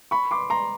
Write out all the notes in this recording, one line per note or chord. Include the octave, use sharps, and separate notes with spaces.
B5 C#6
C6 D6
A#5 C6